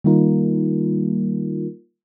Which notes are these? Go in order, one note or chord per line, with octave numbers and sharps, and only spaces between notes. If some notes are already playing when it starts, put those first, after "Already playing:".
D#3 G3 A#3 D#4 F4 A#4